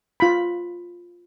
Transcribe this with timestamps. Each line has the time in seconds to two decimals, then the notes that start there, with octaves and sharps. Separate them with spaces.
0.20 F4 B5